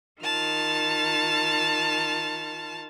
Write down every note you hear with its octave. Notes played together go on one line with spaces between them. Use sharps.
D#3 F4 A5 F6